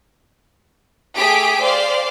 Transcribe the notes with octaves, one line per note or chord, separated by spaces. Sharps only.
A3 G4 G#4 E5 B6 D7
C5 D5 F5